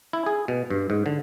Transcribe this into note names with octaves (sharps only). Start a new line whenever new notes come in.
E4
G#4
B2
G2
G#2
D3